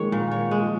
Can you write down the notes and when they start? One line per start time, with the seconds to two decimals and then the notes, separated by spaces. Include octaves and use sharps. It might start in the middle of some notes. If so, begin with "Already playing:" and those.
Already playing: D#3 F3 G#3 A#3 C#5
0.12 A#2
0.31 C#5
0.51 G#3
0.61 F3